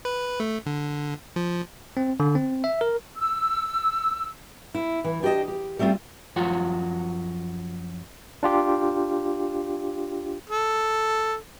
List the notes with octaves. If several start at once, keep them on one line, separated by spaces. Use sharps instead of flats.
B4
A3
D3
F3
C4
D3
C4
E5
A#4
E6
E4
E3
D4 G4 A4 D#5 A5
G4
G3 A3 C4 D4 F4
F#2 F3 F4 F#4 F#5
D4 F4 G4
A4